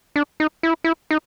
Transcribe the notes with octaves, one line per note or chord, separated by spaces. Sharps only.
D4
D#4
E4
E4
D#4